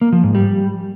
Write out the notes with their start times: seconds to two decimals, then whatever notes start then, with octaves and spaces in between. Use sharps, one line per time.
0.01 A#3
0.13 F3
0.24 G#2
0.35 G3